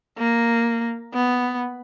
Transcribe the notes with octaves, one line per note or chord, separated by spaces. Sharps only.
A#3
B3